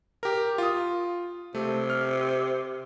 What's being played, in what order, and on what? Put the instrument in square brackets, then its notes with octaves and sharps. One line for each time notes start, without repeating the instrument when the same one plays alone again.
[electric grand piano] G4 A#4
F4 D#6
[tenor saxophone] C3 [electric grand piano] A3
[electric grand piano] F6